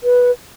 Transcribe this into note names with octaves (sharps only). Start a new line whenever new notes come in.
B4